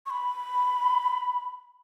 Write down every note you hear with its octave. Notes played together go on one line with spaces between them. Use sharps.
C#6
B5